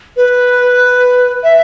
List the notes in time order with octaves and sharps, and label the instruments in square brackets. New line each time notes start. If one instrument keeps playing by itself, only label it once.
[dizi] B4
E5